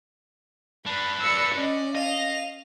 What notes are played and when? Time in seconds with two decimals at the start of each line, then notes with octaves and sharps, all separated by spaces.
0.86 D4 B4 B5
1.21 D5 B5 E6 C#7
1.56 C#4 D5 D#5
1.95 D#5 F5 F7